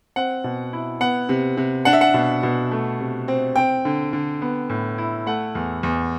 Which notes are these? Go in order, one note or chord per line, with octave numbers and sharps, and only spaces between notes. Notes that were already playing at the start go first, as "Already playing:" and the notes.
C4 F#5
B2
E4
B3 F#5
C3
C3
D4 F#5
E5
F#5
B2
B2
A3
C3
C4
C4 G5
D3
D3
B3
A2
E4
A3 F#5
E2
E2